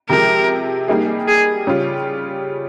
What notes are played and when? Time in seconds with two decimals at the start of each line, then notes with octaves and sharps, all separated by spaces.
0.09 C3 F3 G#3 A#4
0.88 G3 A#3 D#4 G#4
1.28 G#4
1.67 C#3 G3 C#4 F4